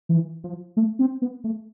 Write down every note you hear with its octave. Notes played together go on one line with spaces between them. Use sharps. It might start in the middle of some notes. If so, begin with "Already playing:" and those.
E3
F3
A3
C4
B3
A3